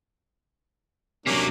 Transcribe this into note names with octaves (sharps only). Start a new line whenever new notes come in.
C3 F#3 A#3 C#4 D4